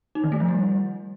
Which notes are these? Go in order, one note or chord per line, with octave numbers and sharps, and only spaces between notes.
D#4
D#3
A3
F3
G3